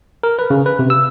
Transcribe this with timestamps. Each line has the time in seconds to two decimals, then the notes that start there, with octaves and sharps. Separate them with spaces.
0.23 A#4
0.39 B4
0.50 C#3
0.66 B4
0.79 C3
0.90 E6